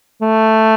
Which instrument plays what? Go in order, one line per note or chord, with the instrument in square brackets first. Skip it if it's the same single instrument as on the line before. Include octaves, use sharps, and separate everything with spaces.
[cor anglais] A3